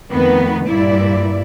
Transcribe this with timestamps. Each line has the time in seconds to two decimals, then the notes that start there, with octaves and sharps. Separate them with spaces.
0.10 F2 D#3 A3 B3 B4
0.67 G2 A#2 E4 D5